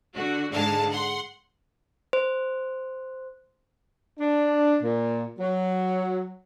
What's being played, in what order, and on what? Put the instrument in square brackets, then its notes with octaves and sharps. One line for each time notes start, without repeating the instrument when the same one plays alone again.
[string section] D3 F#4
G#2 D3 G#3 F5 A5
F#5 C6
[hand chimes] C5
[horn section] D4
A#2
F#3